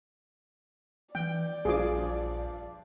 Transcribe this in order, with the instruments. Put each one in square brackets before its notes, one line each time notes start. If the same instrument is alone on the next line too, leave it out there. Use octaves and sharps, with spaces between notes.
[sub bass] E3 [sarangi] D5 [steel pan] G5
[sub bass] A#1 [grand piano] G2 F3 [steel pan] G#4 D6